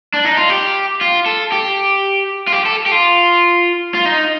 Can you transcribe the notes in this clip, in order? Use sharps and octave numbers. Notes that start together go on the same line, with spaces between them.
D4
D#4
F4
G4
F4
A4
G4
F4
G4
A4
G4
F4
F4
D#4